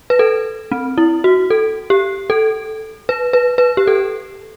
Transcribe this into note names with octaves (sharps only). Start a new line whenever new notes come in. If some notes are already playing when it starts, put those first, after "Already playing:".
B4
A4
C4
E4
F#4
A4
G4
A4
B4
B4
B4
G4
A4